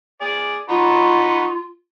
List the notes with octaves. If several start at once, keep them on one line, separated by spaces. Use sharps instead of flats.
G#4 D5
D#4 F4 F#4 B4